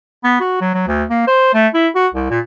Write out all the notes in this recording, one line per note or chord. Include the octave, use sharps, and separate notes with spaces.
B3
F#4
F#3
F#3
D2
A#3
C5
A3
E4
F#4
C2
A#2